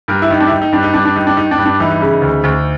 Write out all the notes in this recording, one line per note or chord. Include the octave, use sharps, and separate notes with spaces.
G2 A#4
E4
D#3 D#4
D4
E4
D#3 D#4
D#4
G2 D4
D#4
G2 D4
D4
D#3 D#4
D4
D#3 D#4
D4
G2
D4
E3 D#4
D#4
C#3
D#4
D2
D2